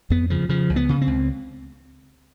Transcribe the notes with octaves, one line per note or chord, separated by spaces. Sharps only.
F2 B3
C#3 F3
C#3 F3
C#2
B3
C#3
C4
C#2